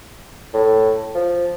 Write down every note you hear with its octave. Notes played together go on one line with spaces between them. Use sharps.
A2
F3